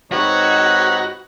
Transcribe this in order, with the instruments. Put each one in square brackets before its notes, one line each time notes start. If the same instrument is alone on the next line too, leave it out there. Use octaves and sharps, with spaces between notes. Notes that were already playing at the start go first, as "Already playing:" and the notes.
[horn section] G#2 C4 D#4 [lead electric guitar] F#4 [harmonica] B4 C#5